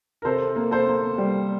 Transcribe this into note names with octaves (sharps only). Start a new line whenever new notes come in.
A#4
C3 A4 C5
A#3
A4 C5
A#3
G3